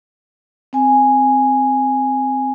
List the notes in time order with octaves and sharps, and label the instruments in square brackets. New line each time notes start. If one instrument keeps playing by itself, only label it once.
[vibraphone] C4 G#5